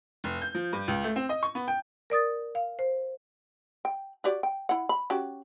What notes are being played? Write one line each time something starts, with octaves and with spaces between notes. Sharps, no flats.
F1
G6
F3
G2
C#2
A3
C4
D#5
C#6
B3
G5
A#4 D5 D#6 A6
F5
C5
G5
F#4 G4 D5
G5
E4 F#5
B5
C#4 F#4 G4